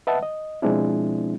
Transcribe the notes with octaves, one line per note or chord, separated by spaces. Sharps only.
B4 D#5 E5 F#5 A5
D#5
B2 F3 G#3 C4 D4 E4